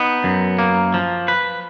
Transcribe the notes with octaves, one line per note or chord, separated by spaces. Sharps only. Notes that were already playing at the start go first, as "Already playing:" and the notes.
Already playing: B3 D#4
F#2
A#3
F3
B4